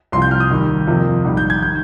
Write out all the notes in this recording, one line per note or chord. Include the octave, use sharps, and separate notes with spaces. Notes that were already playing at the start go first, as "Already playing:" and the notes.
C2 C3 F3 C6
G6
F6
D#6
D#2 D#3 G3
F2 C3 F3 A#3
A#1 G#2 D#3 G3
G6
G#6
D#3 G3 G6